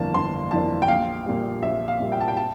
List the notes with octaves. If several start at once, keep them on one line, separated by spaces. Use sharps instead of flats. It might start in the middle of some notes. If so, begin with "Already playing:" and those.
Already playing: G1 F2 E3 A#3 D4 A5
G1 C6
F2 E3 A#3 D4 A5
G5
A#1 F5
A#2 G3
A#1 E5
F5
A#2 G3
G5
A5
G5
A5